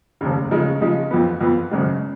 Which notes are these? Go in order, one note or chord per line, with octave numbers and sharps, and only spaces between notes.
F1 D#2 C#3
C#3 F3 G#3 D#4
C#3 F3 G#3 D#4
F2 F3 B3
F2 F3 B3
G#1 F#2 C#3 G#3